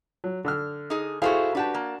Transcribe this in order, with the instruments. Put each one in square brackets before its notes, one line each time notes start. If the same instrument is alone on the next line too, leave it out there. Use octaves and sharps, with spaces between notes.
[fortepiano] F#3
D3 E6 F6
[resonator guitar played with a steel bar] D#4 G#4
[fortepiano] E4 G#4 C5 [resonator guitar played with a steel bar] F#4 A4 F5
[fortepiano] D4 F#4 A5 [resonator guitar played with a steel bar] G4 B4
[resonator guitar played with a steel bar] A#3